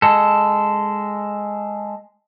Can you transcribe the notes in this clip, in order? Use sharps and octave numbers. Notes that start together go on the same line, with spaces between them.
G#3 A4